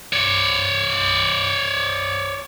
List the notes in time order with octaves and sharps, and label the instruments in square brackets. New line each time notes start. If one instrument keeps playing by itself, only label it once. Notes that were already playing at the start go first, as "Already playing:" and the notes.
[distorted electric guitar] C#5 D5